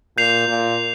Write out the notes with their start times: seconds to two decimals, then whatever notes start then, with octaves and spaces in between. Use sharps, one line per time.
0.17 A#2 G6 C7 F7
0.48 A#2